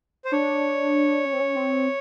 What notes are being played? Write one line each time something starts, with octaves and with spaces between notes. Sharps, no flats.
C5
D4 C#5
C#4
C4
C#4
C4